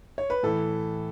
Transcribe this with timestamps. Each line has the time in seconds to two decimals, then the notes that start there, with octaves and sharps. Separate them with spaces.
0.18 C#5
0.30 B4
0.43 A2 E3 A4